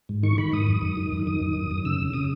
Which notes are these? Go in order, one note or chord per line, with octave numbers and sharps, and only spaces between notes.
G#2
D#3 C#6
D#3 B5
G#2 D#6
F#2
F#2
D#3
F#2
D#3 D#6
F#2
F#2
F#2
C#3 E6
C#3
C#3 D#6